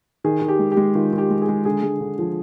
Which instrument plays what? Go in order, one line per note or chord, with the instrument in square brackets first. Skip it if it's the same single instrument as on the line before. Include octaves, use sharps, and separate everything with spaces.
[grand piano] D#3 G#4
D#3
G4
G#3
G4
G#3
D#3 F4
D#3
G4
G#3
G#4
G#3
D3 G#4
G#3
D3
F3